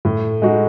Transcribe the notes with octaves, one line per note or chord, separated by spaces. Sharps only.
A2
G#3 D#4 F#4